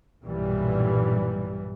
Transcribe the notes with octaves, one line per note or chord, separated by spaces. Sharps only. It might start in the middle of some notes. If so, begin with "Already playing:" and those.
B1 G2 A#2 E3 G3